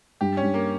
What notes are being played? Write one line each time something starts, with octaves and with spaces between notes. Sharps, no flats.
G2 G4
C#4
G2
A#3